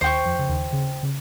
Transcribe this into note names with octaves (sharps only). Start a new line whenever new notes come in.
D#2 D#3 C5 G5 C#6
F2 F3
C#3
D#2 D#3
C#3
C#3